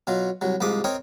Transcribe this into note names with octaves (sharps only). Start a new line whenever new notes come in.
B2 F#3 F4
C2 F#3
C2 G#2 F3 D6 D#6
C4 A#4 C#5 D#5 G5